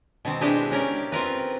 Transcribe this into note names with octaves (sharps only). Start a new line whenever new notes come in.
B2 D#3 C4
G#3 D4 E4 G4 B4 D#5
C#4 A#4 D5
C4 F4 A#4 B4